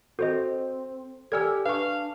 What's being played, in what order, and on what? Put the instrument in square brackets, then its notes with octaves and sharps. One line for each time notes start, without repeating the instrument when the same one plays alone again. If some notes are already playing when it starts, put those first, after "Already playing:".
[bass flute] C4 [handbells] F#4 C5 D#5 [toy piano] A4
[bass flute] G4 [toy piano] A4 D5 G#5 [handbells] E6 F6 G#6
[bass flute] D4 [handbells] B4 C#6 [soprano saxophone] F5